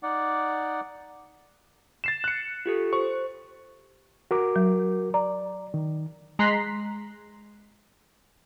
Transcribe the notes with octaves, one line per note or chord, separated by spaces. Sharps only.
D#4 D5 F#5 D6
A6 C7 E7
F#6 C#7
F4 G4 A4
C5 C#6
F#4 A#4 D6
F#3
D5 A#5
D#3
G#3 A#5 C6 F#6 B6 C7